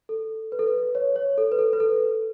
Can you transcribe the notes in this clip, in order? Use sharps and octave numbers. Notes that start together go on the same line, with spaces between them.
A4
B4
A4
B4
C#5
C#5
A4
B4
A4
B4
A4